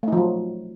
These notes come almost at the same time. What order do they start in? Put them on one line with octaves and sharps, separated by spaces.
A3 D#4 F3 F#3